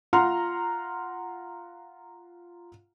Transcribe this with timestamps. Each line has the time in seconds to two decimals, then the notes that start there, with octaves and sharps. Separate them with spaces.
0.13 F4 F#5 A#5 C6 F6